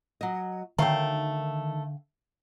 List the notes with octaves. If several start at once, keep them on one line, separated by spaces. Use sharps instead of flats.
F#3 D#5
D3 D#3 F#3 A3 F5 G5